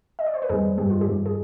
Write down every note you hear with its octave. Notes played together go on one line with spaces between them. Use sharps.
D#5
D5
C5
B4
F2 D#3 G3 G#4
G2 D#3 G3 G4
F4
G4
G2 D#3 G3
G#4